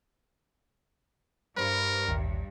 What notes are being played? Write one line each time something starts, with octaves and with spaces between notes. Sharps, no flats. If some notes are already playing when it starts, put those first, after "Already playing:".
G2 A#4 C5 B5
A1 D#2